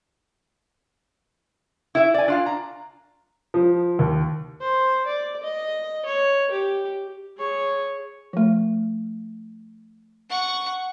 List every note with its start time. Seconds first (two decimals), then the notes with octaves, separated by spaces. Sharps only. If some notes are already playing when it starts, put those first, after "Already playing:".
1.95 E4 E5
2.14 D5 G#5
2.28 D4 F4 F5
2.46 A#5
3.54 F3
3.99 D#2
4.61 C5
5.07 D5
5.43 D#5
6.06 C#5
6.51 G4
7.38 G#4 C#5
8.33 F3 A3
10.30 F#5 C#6